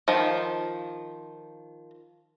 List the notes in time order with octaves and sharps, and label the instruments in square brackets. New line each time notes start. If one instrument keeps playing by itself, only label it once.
[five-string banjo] D#3 F3